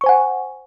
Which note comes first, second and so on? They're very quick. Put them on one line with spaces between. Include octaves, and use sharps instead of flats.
C#6 C5 G#5 F#5